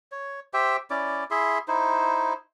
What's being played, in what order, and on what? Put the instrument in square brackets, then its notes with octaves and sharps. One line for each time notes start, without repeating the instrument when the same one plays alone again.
[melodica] C#5
G4 C5 E5 G5
C#4 E4 D5 D6
E4 G#4 E5 C6
D#4 E4 C5